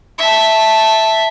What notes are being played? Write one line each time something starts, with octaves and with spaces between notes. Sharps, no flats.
E5 A5